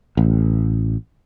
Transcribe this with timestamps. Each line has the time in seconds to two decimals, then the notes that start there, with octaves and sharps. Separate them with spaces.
0.17 A1